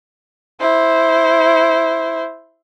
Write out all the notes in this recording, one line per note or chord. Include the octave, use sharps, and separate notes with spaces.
E4 C5